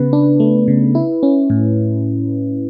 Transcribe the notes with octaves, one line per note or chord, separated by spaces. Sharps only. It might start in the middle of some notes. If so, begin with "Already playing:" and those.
Already playing: C#3 B3 B4
D4
A3
C#3
E4
C#4
A2